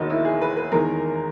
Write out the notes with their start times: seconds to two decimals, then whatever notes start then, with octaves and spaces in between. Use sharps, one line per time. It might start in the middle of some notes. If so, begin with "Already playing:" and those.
Already playing: E1 D#2 D#3 D#4 F#4
0.10 E4
0.25 G#4
0.41 B4
0.57 B4
0.72 E2 D#3 G#3 A#4